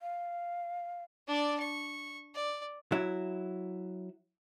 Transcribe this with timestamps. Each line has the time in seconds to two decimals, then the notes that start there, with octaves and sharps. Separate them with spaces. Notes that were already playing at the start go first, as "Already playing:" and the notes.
0.02 F5
1.28 D4 D5
1.60 C#6
2.34 D5
2.92 F#3 E4